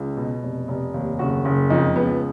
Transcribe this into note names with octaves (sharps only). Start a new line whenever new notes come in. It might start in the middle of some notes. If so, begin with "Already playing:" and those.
Already playing: C#2
B2
F1
F1
D#2
F#1 F#4
F#1
F2 D#4
C#2 B3